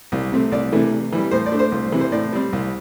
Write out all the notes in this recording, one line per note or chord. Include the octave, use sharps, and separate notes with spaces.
C2
C3 A3 C4
C2 D5
C3 E3 A3
C3
E3 G3
A2 C5
D5
A3 D4
C5
C2
C3 E3
C5
A2 D5
G3 C4
C2